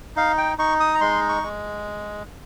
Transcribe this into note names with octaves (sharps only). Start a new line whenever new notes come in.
D#4 F5
G5
D#4 C#6
D#6
A#5
G#3 C6
C#6
G#3